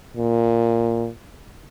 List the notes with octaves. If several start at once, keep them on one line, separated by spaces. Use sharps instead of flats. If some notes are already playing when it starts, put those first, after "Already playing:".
A#2